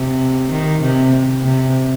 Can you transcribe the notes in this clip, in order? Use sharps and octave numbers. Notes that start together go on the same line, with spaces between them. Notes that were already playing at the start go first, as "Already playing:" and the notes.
Already playing: C3
D#3
C3
C3